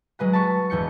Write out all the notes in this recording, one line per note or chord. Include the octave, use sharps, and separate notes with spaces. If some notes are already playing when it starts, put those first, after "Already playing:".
F#3 G#3 B4 F#5
A5 B5 C#6
E1 E2 G6 C#7